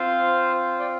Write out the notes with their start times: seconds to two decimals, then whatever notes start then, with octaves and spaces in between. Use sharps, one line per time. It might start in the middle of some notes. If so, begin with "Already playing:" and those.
Already playing: C4 F4 C5 F5
0.79 D5 G5